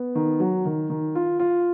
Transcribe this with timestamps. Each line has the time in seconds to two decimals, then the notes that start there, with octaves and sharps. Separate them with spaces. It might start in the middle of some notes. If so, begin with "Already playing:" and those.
Already playing: B3
0.15 D#3
0.40 F#3
0.65 D#3
0.90 D#3
1.15 F4
1.39 F4